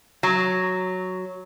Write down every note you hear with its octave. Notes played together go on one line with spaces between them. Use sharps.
F#3